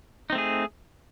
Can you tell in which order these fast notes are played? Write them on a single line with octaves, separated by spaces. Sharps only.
D#4 C4 A3 G#4